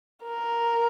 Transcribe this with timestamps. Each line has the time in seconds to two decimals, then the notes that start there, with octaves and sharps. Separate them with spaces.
0.25 A#4